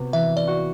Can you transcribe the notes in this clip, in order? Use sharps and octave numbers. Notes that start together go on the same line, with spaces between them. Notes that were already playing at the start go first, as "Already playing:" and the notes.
Already playing: C3 B3 F#4
E3 E5
D5
F#4